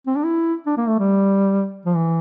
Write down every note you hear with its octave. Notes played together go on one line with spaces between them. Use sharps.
C4
D4
E4
D4
A#3
A3
G3
F3
E3